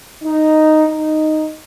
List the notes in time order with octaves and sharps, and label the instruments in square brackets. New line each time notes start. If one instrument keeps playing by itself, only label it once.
[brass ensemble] D#4
D#4